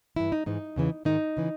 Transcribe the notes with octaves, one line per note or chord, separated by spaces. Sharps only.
G2 E3 E4
D#4
G#2 E3 D#4
E2 C#3 E3
G#2 D#3 D#4
C#3 E3